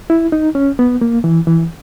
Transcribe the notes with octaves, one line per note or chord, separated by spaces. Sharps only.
E4
D#4
C#4
B3
A#3
E3
E3